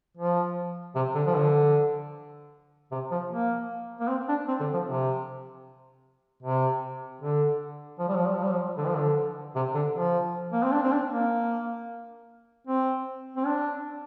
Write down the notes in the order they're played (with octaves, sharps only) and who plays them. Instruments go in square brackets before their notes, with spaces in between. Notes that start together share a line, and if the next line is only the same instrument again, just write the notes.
[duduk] F3
C3
D3
F3
D3
C3
F3
A#3
A#3
C4
D4
C4
D3
F3
C3
C3
D3
F3
G3
F3
G3
F3
G3
F3
D3
F3
D3
C3
D3
F3
A#3
C4
D4
C4
D4
A#3
C4
C4
D4